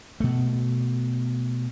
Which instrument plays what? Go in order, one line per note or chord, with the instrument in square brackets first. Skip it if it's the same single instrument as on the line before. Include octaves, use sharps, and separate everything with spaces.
[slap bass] B2 A3